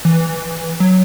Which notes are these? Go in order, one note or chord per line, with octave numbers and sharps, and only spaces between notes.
E3
F#3